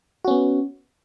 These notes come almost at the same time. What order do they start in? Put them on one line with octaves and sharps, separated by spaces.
F#4 C#4 B3